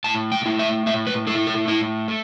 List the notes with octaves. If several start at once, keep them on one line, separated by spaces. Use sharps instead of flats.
A2 A5
G5
A3 E4
E5
A2 E5
B4
A3 E4 A4
A4
A2 E4
A3